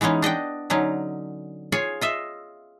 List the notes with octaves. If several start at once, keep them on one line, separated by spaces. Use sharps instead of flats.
E3 G#3 B3 C#4 D#4
D4 D#5 F#5 G5
D3 F#3 C#4 D#4
F4 G#4 C#5 G#5
F4 D#5 E5